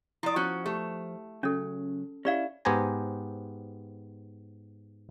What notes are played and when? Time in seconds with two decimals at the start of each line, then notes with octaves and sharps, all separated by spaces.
0.23 F3 E4 D5 D#6
0.36 F3 C#4 F#4
0.66 A3 G4
1.43 C#3 F#3 C#4 A4
2.25 C#4 E4 G4 D5 F5
2.65 G#2 B3 G4 C5 G#5 A#5